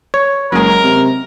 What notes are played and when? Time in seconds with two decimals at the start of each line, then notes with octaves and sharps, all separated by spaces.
0.14 C#5
0.52 F#1 F#3 G#3 A#4
0.84 C3